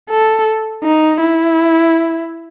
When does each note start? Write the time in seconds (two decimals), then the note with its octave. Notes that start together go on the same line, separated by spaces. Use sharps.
0.10 A4
0.84 D#4
1.21 E4